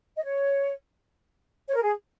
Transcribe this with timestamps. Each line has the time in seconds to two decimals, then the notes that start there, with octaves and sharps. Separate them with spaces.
0.16 D#5
0.24 C#5
1.68 C#5
1.75 A#4
1.83 G#4